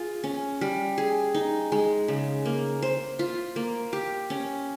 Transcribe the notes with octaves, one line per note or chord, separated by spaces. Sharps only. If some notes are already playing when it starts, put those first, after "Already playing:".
Already playing: F4 G#4
C#4
G3
G#4
D#4
G#3
C#3
A#3
C5
F4
A#3
G4
C#4